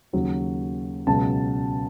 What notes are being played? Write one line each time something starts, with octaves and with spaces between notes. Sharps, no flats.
D#2 C#3 F#3
C#2 B2 F#3 A5